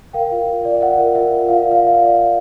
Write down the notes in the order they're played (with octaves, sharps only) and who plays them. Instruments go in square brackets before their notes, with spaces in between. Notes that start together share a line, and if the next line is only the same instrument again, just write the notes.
[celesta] A#4 F5 G5
F4
F4
D5
F4 E5 F#5
A#4
F4 E5
F4
F4 F5
D5
F5
F4 E5
F5
D5
D5